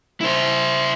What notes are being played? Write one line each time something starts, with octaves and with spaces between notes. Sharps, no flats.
E4 C5